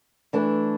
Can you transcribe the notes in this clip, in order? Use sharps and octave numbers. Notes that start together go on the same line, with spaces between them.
E3 A3 D4 A4